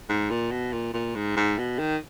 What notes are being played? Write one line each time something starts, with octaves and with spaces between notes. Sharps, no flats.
G#2
A#2
B2
A#2
A#2
G#2
G#2
B2
D#3